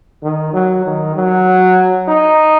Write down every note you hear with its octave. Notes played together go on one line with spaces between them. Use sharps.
D#3
F#3
D#3
F#3
D#4